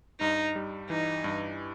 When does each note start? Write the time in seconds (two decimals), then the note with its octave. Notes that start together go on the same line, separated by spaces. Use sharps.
0.20 G2 D#4
0.56 G3
0.90 E3 D#4
1.24 G2